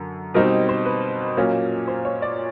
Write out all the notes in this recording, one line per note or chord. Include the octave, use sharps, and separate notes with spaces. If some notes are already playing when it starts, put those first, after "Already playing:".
Already playing: F#2 D3
B2 G3 C4 D#4 A#4
C5
B4
A#2 F#3 A#3 C#4 F4
C5
C#5
D5